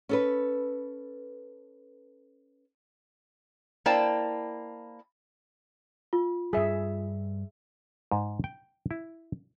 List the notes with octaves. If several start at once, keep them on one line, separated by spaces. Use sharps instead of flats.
C#4 A4 B4
A#3 E4 C5 D5 G5 A5
F4
G2 G3 G#4 E5
G#2
G5
E4